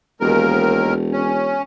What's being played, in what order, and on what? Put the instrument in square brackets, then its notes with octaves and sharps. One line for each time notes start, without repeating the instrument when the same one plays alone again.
[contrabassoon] E1 [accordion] D#2 A#4
[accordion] C#4